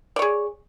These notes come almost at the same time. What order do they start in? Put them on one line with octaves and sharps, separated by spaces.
D5 C#5 G#4